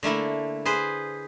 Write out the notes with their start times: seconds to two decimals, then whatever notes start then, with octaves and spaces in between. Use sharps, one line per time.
0.03 D3 A3 A#3 E4
0.65 G#4 B4 C5